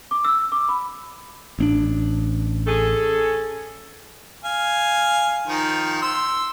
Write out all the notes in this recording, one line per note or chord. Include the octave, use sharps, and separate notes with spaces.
D6
E6
D6
B5
A1 C4 D4
C#4 G#4 A4
F5 G#5
D#3 F3
C6 E6